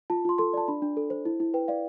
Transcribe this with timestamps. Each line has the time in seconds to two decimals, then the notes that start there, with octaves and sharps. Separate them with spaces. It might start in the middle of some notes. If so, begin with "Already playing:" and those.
0.10 F4 A5
0.25 F4 C6
0.38 A4 C6
0.53 D5 A5
0.68 D4 B5
0.82 D4
0.97 A4
1.10 C5
1.25 E4
1.40 E4
1.54 B4 G5
1.68 D5 F5